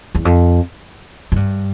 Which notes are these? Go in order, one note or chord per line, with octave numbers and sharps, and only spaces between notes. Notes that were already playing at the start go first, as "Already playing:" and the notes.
E2
F2
G#2
G2